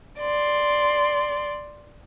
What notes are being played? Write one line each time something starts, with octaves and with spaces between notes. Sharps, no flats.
D5 C6